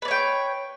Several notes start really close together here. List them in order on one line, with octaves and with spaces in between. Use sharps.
B4 D5 C#5 G5